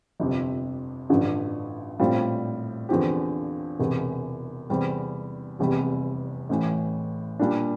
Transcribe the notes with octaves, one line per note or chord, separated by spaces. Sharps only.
G1 F2 C3
A1 G2 D3 F3
A#1 A2 G3 C4 F4
E2 D3 F3 C4 G4
E1 E2 C3
E2 C3 G3 C4
F1 E2 C3 G3
A1 A2 E3
A#2 G3 D4